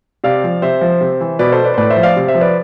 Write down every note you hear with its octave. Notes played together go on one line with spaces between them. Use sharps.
C3 D5 F5
F3
C3 C5 E5
F3
C3
E3
B2 B4 D5
A4 C5
B4 D5
C5
A2 B4 D5
C5 E5
F3
D5 F5
C3
C5 E5
F3
B4 D5